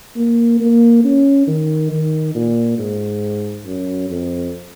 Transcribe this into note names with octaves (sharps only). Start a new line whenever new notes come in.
A#3
A#3
C#4
D#3
D#3
A#2
G#2
F#2
F2